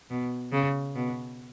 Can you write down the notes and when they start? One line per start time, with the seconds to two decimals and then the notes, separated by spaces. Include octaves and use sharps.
0.10 B2
0.52 C#3
0.95 B2